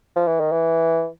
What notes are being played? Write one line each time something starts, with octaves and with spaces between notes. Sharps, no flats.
F3
E3
D#3
E3